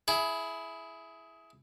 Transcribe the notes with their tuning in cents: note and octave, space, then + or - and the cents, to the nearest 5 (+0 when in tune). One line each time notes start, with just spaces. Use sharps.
E4 +0 G#4 +20